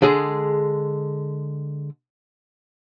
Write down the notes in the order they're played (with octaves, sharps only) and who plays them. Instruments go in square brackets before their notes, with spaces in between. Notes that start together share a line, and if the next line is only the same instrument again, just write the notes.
[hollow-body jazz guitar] D3 G#3 G#4